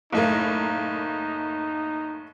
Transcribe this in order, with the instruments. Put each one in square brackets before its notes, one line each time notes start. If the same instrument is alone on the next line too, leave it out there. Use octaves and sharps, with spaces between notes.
[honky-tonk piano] F#1 A2 A#3 [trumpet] D#4